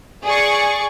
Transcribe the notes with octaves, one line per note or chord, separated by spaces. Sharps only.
G#4 D5 C#6